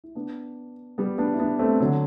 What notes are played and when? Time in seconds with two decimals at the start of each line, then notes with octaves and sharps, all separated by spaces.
0.04 E4
0.15 B3 D4
0.98 G3 B3
1.18 B3 D4
1.34 E4
1.40 B3 D4
1.59 A3 C4
1.80 D3 F#3